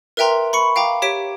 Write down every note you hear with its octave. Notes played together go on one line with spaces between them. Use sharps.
A#4 B4 E5 G5 A#5 C6
B5 C#6 C#7
F5 G5 A#5 D6
G4 C#5 B6 D7